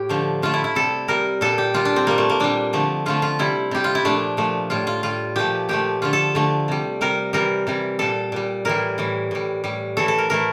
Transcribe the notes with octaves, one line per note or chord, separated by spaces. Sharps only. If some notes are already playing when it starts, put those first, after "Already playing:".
Already playing: A2 G4
D3 F3 A3
D3 F3 A3 F4
E4
E4
C3 G3 A4
C3 G3 A#4
A#2 G3 A4
G4
A#2 G3 F4
D4
C4
A#2 G3 A#3
A3
A#3
A#2 G3 D4
D3 F3 A3
D3 F3 A3 F4
F4
C3 G3 E4
C3 G3 G4
F4
E4
A#2 F3 A3 D4
A#2 F3 A3
A2 G3 F4
F4
A2 G3 F4
A#2 F3 A3 G4
A#2 F3 A3 G4
D3 F3 A3 F4
A4
D3 F3 A3
C3 G3
C3 G3 A#4
C3 E3 G3 A#4
C3 E3 G3
A#2 G3 A4
A#2 G3
A2 E3 G3 A#4
A2 E3 G3
A2 G3
A2 G3
A2 E3 A3 A4
A4
A#4
A2 E3 A3 A#4